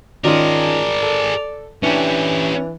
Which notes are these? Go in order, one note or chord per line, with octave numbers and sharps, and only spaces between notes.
D#3 C#4 F4 G#4 A#4 D5
A4
E3 C#4 D4 G4